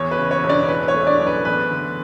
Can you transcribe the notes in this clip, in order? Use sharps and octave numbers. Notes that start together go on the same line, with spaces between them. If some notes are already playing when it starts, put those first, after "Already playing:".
Already playing: E2 C#5
B4
C#3
C#5
E1
D4 D5
E3 B4
C#5
A3
D4 D5
F#2
B4
E2 B4
D3